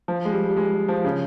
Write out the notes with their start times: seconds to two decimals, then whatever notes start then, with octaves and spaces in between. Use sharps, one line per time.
0.08 F3
0.25 G#3
0.32 G3
0.49 G3
0.57 G#3
0.88 F3
1.05 C#3